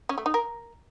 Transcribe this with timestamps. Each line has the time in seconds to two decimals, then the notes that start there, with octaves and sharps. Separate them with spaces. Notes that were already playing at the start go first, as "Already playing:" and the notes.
0.09 C#4
0.18 A3
0.26 D#4
0.34 A#4